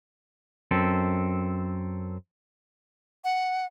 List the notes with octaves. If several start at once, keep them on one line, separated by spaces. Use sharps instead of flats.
F#2 C4 A4
F#5